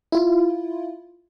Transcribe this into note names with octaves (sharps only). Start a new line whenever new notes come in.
E4 F4